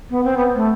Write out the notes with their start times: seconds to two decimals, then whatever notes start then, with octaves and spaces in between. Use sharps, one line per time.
0.10 B3
0.24 C4
0.37 B3
0.55 A3